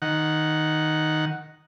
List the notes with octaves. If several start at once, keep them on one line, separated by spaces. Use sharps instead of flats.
D#3 F#5